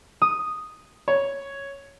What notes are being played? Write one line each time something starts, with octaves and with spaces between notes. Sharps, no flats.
D#6
C#5